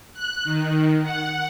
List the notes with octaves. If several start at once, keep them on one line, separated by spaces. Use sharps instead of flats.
F#6
D#3
F#5